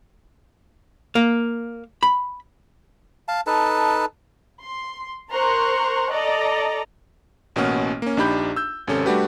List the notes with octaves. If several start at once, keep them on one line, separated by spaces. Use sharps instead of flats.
A#3
B5
F5 A5
D#4 A4 B4 A5
C6
A#4 C5 A#5 C6 C#6 F#6
A4 D5 D#5 A#5
A1 B2 A#3 C#4 F#5 F6
A#3 C#4
A#1 D4 D#4 G4 B5 G6
E6 G6
G#1 C3 C#4 A4
G3 A3 D4 F#4 G4 B4